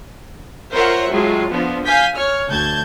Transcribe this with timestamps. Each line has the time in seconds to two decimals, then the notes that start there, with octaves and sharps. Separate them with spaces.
0.71 F4 A#4 C5 C#5 E5 F#5
1.10 A2 F#3 G#3 F4
1.50 D3 F3 B3
1.85 F5 G#5 G6 B6
2.15 C#5 F6
2.49 D2 A5 G6 G#6